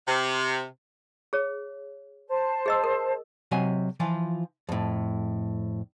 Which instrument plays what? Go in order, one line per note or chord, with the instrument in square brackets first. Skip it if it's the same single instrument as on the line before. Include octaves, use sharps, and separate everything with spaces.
[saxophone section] C3
[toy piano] G#4 C#5
[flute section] C5 A5
[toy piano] G#4 D#5 E6
A#4
[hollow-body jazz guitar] C3 F#3 D#5 G#5
E3 F3 F4
F2 A2